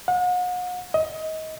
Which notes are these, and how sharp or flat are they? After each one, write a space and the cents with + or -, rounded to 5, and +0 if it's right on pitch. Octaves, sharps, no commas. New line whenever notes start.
F#5 -40
D#5 +25